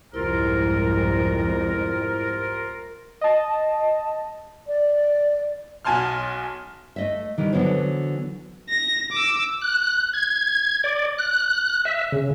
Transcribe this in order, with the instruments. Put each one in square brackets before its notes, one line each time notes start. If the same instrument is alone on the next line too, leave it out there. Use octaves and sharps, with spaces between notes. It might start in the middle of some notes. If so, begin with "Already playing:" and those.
[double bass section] C2 F2 G#2 [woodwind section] C3 F4 A#4 [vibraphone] E4
[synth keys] D#5 A5
[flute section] D5
[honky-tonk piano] B1 F#4 G#5 A5 C6 F6
[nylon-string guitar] A3 D#5 E5
D#3 E3 G3
D3 E3 F#3 B3 C5 C#5
[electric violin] A#6
D6 E6
[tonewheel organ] F#6
G#6
D5
F#6
E5
C#3